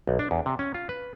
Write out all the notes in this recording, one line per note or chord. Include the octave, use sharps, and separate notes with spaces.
B1
D4
E2
C3
C#4
F4
B4